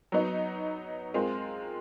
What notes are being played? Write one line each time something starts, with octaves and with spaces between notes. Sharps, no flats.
F#3 B3 D#4
G#3 C4 F4 A#4